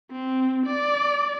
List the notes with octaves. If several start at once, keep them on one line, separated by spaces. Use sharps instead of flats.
C4
D5